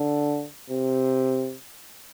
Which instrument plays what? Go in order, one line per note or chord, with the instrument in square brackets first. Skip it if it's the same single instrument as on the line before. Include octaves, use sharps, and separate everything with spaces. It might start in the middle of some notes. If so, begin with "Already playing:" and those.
Already playing: [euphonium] D3
C3